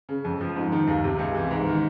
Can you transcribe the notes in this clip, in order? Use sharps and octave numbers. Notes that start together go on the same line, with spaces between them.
C#3
F2
F3
G#2
D#3
D#2
C3
C#2
E3
G#2
D#3